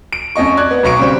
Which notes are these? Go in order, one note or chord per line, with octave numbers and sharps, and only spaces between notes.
D7
F2 C#4 D#5 C#6
D5 F#6 G#6
B3
B1 F#3 C#6 D7
C#3 G3 C4 C#6